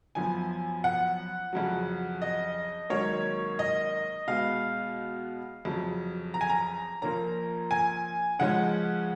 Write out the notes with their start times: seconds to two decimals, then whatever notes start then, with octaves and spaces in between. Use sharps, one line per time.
0.15 F#2 F3 B3 G#5
0.84 F#5
1.53 F2 C#3 F#3
2.22 D#5
2.90 G#2 D#3 F#3 A#3 C#4 C#5
3.59 D#5
4.27 B2 G#3 B3 F5
5.65 F2 C#3 F#3
6.34 A#5
6.41 G#5
6.49 A#5
7.02 A#2 F3 A#3 C#4 A#5
7.71 G#5
8.39 C#3 F3 G#3 C#4 F#5